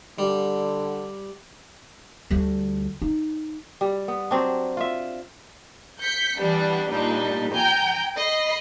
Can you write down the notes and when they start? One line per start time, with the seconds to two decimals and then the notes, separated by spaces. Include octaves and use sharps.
0.19 D3 G3
2.30 D2 G3
3.02 D#4
3.81 G3
4.08 B3
4.31 F#3 C4 D4
4.77 F4 E5
6.01 G6 B6 C#7
6.39 E3 G3 B3 D4
6.88 A#2 G3 D4 D#4
7.53 G5 G#5 A#5 G6
8.16 D#5 B5 C7